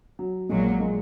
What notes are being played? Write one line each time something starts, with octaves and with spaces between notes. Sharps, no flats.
F#3
A#1 A#2 F#3 G#3
A#3
G#3